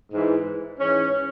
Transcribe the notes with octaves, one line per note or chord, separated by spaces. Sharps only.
G#2 E3
G#2 E3 C#4